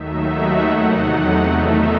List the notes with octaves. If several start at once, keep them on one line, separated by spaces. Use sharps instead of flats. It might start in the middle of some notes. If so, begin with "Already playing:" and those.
Already playing: D#2 D#3 F#3 A3 D#4 E5
F#5
E2 C3 F#3 A3 D#4 F#5
E2 D#3 A3 D#4 E5